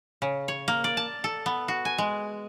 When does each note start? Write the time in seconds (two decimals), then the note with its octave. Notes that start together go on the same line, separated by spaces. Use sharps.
0.22 C#3
0.48 C#5
0.68 A#3
0.84 D5
0.97 A5
1.24 A4
1.46 B3
1.68 F#4
1.85 G#5
1.98 G#3